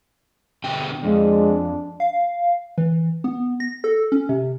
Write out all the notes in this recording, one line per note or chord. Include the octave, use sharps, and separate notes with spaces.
B2 D3 G5
F2 G#3 D4
F5
E3
B3
A#6
A4
C#4
C3